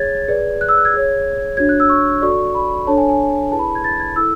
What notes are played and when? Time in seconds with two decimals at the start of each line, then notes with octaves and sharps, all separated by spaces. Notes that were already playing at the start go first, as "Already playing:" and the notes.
Already playing: G#4 C#5 G#6 A6
0.28 G#4 B4 D5
0.61 F#6
0.69 E6
0.77 F#6
0.85 G#6
0.94 G#4 C#5
1.57 D4 F#4 C#5 G#6
1.69 F#6
1.80 E6
1.89 C#6
2.22 F#4 A4 D5 C#6
2.55 B5
2.87 D4 A4 C#5 A5
2.98 G#5
3.09 G#5
3.51 E4 G#4 B4 A5
3.59 B5
3.68 A5
3.75 G#6
3.84 A6
4.00 G#6
4.16 E4 A4 E6